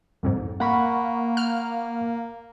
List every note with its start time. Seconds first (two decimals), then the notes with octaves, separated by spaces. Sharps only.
0.23 C2 F2 G#2
0.60 A#3 F#5 B5 C#6
1.37 F6